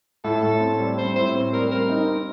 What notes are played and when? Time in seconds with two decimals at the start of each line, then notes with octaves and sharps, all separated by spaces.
0.24 A2 A4
0.43 A2
0.60 C4
0.79 G3
0.97 C4 C5
1.16 A2 C5
1.35 C4
1.53 G3 A#4
1.71 C4 A#4
1.90 D#4
2.08 C4